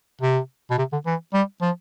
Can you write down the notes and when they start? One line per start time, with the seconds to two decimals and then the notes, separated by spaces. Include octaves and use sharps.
0.21 C3
0.71 B2
0.78 C3
0.92 D3
1.06 E3
1.34 G3
1.62 F3